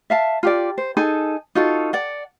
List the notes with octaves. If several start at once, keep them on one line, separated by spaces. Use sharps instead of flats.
E5 F5 A5
F4 G4 D5
C5
D#4 G#4 A4 G#5
D#4 F4 F#4 A4
D5 F#5